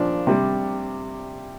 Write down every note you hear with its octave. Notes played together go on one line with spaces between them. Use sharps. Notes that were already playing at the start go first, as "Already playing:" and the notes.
Already playing: A#2 F3 D4
C3 G3